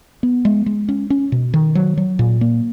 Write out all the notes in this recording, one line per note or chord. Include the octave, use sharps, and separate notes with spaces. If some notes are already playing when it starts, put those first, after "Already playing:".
B3
G#3
G#3
C#4
C#4
B2
D#3
F#3
F#3
A#2
A#3